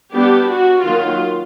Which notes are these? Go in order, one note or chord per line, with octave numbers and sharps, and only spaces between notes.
G3 B3 D4 G4
F#4
D#3 F#3 A#3 F4